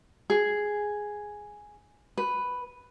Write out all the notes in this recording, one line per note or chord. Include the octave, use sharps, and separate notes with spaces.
G#4
B4